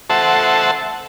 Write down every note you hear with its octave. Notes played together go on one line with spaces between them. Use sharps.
A4 C5 E5 F#5 A5